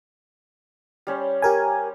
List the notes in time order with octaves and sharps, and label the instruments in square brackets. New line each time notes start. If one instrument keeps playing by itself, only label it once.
[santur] G3 C#4 C5
[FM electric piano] G4 A#4 G#5